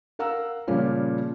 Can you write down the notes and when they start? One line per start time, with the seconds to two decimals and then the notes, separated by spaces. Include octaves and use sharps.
0.19 A#4 F5 F#5 A#5 E6
0.68 A#2 C#3 F3 G3 C#4 F4